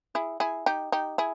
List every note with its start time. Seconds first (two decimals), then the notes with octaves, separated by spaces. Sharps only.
0.15 E4 G#4
0.40 E4 G#4
0.66 D#4 G4
0.92 D#4 G4
1.18 E4 G#4